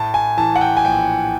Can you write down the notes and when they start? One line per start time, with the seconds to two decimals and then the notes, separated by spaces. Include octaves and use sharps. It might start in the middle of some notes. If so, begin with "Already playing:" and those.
Already playing: A2 A5
0.14 G#5
0.37 E3 A5
0.56 F#5
0.61 G5
0.77 G#5
0.85 A#1 G5